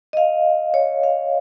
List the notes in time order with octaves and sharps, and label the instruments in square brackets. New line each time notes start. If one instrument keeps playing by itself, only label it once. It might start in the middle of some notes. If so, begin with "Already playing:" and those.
[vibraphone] D#5
F5
C#5
F5